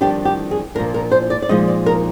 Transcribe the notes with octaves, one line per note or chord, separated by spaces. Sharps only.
F2 D#3 G3 D4 G4
G4
G#4
A#2 F3 A#3 D4 A#4
A#4
C5
D5
D5
A#2 F3 G#3 D#4 D#5
D5
A#4